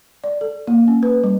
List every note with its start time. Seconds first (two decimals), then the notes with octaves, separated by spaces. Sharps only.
0.24 D5
0.41 A4
0.67 A#3
0.88 C#4
1.03 B4
1.24 G3